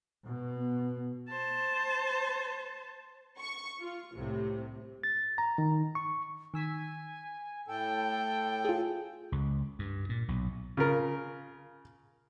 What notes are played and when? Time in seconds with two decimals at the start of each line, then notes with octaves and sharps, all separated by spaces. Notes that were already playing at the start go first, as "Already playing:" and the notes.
0.25 B2
0.56 B3
1.29 C5 A5
3.39 C#6
3.81 F4
4.16 C2 A2 C3
5.04 A6
5.38 A#5
5.58 D#3
5.95 C#6
6.54 D#3 G#5 E6 B6
7.67 A2 A4 G5
8.65 F4 G#4
9.32 C#2
9.79 G2
10.09 A#2
10.28 B1
10.77 C#3 F4 A#4